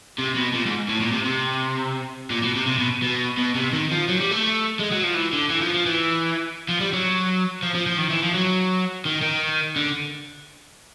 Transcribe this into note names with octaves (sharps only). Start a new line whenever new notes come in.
C3
B2
A#2
G#2
A2
A#2
C3
C3
A#2
B2
C3
C3
B2
B2
B2
C3
D#3
F3
F#3
G3
A3
G#3
F#3
F3
E3
D3
E3
F3
F3
E3
F3
G3
F#3
F3
F3
F3
D#3
E3
F3
F#3
D#3
D#3
D3